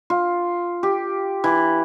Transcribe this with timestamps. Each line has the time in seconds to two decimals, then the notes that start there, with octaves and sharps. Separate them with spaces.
0.10 F4
0.83 G4
1.44 E3